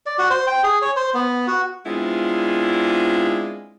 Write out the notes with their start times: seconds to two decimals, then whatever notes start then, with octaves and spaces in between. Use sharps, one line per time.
0.06 D5
0.18 F#4
0.30 C5
0.47 G5
0.64 G#4
0.82 C#5
0.96 C5
1.14 B3
1.47 F#4
1.86 G#3 B3 C4 D4 E4 F4